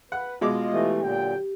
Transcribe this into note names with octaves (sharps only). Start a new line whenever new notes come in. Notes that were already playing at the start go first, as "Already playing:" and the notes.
B4 F#5
B2 G#3 F4 D#5 D6
E3 A3 G4
A#2 D3 F#3 G5